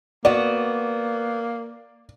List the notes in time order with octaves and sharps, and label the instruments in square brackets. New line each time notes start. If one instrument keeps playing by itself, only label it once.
[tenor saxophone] A#3 [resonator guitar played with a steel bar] B3 F#4 [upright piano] D5